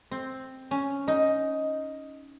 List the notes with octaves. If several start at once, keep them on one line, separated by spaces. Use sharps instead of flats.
C4
C#4
D#4